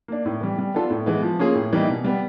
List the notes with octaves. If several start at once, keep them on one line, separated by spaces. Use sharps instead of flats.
A#3 D4
A2
E3 G3
G3
B3 D4 F4 A4
A2
E3 G#3 B3
F3
A#3 C#4 F4 G#4
A2
E3 G3 A#3 D#4
B2
G3 B3